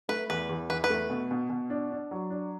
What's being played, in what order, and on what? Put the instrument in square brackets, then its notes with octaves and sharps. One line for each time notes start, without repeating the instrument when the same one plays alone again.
[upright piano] A3 [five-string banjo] B4
[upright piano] E2 [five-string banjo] B4
[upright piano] E2
[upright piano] E2 [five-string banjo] B4
[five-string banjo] B4
[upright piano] A3
B2
B2
B2
D4
D4
F#3
D4